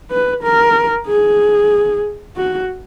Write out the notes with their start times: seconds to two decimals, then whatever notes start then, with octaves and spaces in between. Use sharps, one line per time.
0.11 B4
0.43 A#4
1.07 G#4
2.37 F#4